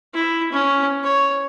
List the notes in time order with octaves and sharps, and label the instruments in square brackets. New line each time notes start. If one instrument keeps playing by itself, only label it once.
[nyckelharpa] E4
C#4
C#5